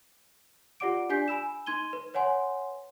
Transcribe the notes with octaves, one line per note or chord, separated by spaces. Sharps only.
F4 G4 D5 F#5 D6 D7
D4 G4 D5 G#5 G6 B6
G#5 B5 E6 E7
D#4 C6 G#6 D#7 G7
B4
B4 C#5 F#5 G#5 C6